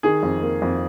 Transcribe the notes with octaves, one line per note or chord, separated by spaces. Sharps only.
D#3 G#4
F2
A#3
F2